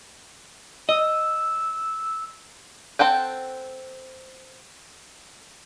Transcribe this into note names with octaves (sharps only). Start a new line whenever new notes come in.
D#5 E6
C4 A4 F#5 G5